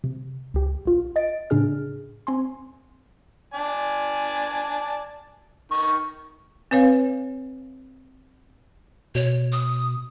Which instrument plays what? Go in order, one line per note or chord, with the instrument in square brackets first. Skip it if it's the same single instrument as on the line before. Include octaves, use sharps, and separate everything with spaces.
[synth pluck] C3
C#2 G4
A#1 F4
D#5 A6 D7
A2 C#3 D4 G#4 F6
C4 G#5 C6
[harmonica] D5 G#5 A5
D#3 C#6
[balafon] C4 B4 C#5 F5
[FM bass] B2 [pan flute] C#5
[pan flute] D#6